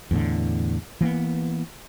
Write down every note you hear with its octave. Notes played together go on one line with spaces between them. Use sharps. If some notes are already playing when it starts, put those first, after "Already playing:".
E2 A2 D3
E3 A#3 B3